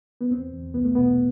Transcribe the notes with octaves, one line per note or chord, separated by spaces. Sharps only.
B3
E2 C4
E2
C2 B3
A3
B2 B3